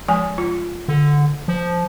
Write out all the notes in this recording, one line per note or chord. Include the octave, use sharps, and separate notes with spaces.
F3 G#3 G#5
F4
D3
F3